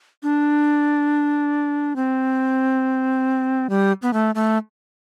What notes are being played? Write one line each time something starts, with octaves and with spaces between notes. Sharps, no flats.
D4
C4
G3
B3
A3
A3